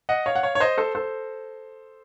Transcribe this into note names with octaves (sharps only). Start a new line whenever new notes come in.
D#5 F#5
C#5 F5
F#5
C#5 F5
C#5
C5 D#5
A4 C5
A4 C5